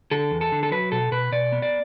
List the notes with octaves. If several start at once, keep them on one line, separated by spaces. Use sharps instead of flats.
D3 A4
E2
A4
D3
A4
F#3 B4
B2 A4
B2 B4
B2 D5
B3
D5